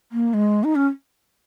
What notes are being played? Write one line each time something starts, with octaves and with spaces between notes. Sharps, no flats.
A#3
G#3
D#4
C#4